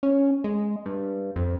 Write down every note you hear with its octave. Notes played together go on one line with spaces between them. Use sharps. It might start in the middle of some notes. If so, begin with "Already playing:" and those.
C#4
G#3
G2
F2